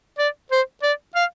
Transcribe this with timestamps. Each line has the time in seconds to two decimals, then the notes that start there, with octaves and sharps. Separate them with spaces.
0.18 D5
0.51 C5
0.83 D5
1.15 F5